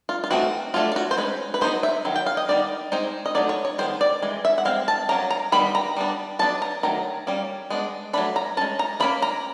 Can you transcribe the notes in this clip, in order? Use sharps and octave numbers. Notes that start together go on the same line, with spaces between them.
F4
F4
E3 A3 C4 D#4 F#4
F#3 A3 D4 F4
F4
F#4
C5
G#3 C#4 B4
B4
F#3 B3 D#4 C5
E5
D#3 F#3
G5
F5
D#5
D#3 G3 B3 D#4 D5
G#3 C4 D#4 C5
D#5
F#3 A3 D#4 D5
C#5
C#5
D#3 G#3 B3 C5
D5
E3 G#3
E5
F#5
G#3 C4 F5
A5
F#3 A#3 C#4 A#5
A#5
D#3 G3 B3 B5
A#5
G3 B3 D4
F#3 B3 D4 A5
A#5
D#3 F#3 A3 A#5
G3 A#3 C#4
G#3 B3 D4
F#3 A3 D4 B5
A#5
G#3 C#4 A5
A#5
F3 A#3 C#4 B5
A#5